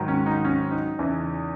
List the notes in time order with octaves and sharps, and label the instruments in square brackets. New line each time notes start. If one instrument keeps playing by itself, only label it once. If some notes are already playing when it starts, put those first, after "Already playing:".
Already playing: [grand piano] G#2 D#3 F#3
C#4
D#4
C#4
D#4
E2 C#3 E3